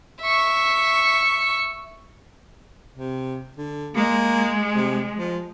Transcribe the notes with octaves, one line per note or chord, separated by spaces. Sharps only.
E5 C#6
C3
D3
G#3 A#3
C3
F3